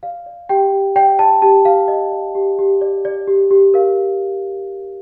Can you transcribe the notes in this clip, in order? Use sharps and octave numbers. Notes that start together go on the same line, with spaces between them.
D5 F5
D5
G4 G5
G4
D5 G5
D5 A5
G4 A5
G4 F5
D5 D#5
D5
G4
G4
D5
D5
G4
G4
A#4 F5